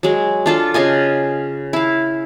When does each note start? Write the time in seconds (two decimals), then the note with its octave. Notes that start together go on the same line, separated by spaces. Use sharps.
0.03 F#3 G#3
0.46 D4 F4 A4
0.74 C#3 F4 D#5 G#5
1.73 E4 F5